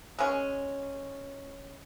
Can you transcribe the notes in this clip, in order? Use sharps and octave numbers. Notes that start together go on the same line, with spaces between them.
G#3 C#4